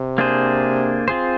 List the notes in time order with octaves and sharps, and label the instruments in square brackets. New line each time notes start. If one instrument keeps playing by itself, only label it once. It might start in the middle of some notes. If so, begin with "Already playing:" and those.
Already playing: [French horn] C3
[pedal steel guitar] A#3 D4 G#4 C5
C4 F4 G#4 C5